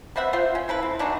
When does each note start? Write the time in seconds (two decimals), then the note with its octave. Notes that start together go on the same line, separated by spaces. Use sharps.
0.16 B3 C4 E5 F#5
0.33 F4 C5 G5
0.55 C#4
0.68 C4 E4 A4 B4
0.83 C4
0.99 E3 D4 D#4 F#4